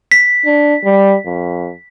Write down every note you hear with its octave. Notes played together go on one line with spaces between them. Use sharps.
B6
D4
G3
F2